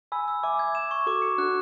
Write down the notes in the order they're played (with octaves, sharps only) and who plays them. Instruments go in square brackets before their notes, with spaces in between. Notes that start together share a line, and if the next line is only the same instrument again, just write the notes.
[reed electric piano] G#5 B5 [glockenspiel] E6
[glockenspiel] E6
[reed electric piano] E5 G#5 [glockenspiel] D6
[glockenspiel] G#6
E7
C#6
[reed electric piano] F#4 A4 [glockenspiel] D6
[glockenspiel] C#7
[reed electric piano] D4 F#4 [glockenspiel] F#6